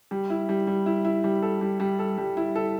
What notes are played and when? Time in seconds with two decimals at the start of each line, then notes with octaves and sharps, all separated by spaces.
0.11 G3
0.30 E4
0.49 G3
0.67 G3
0.86 E4
1.05 E4
1.24 G3
1.42 A4
1.61 G3
1.80 G3
1.99 A4
2.18 G3
2.37 E4
2.56 A4